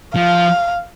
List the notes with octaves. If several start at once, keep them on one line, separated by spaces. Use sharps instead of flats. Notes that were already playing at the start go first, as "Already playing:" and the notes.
F3 F5